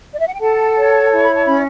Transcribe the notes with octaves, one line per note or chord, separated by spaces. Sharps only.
D5
E5
F#5
G5
A4 F#5 A5
C#5
E4 A5
B5
A5
C#4 B5